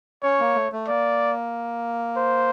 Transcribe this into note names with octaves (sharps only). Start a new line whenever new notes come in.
C#4 C#5
A#3
A3
A3
A#3 D5
C5